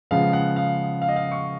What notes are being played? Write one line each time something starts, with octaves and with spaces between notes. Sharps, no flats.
C#3 F3 G#3 B3 F5
F#5
F5
F5
D#5
F5
C#6